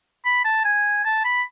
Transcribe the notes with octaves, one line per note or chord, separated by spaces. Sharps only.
B5
A5
G#5
A5
B5